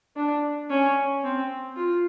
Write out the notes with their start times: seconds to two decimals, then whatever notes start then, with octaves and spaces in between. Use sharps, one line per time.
0.16 D4
0.70 C#4
1.24 C4
1.76 F4